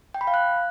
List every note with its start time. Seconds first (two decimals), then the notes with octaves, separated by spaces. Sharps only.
0.14 G5
0.21 B5
0.27 F5
0.34 F#6